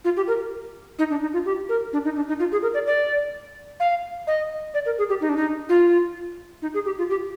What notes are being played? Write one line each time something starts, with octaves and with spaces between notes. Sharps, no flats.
F4
G4
A#4
D#4
D4
D#4
F4
G4
A#4
D4
D#4
D4
D#4
F4
G#4
A#4
D5
D5
F5
D#5
D5
A#4
G#4
G4
D#4
D4
D#4
F4
D#4
G#4
G4
F4
G4